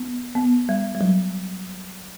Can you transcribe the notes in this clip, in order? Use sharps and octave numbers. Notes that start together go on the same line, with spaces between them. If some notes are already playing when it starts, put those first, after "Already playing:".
Already playing: B3
B3
G3
G3
F#3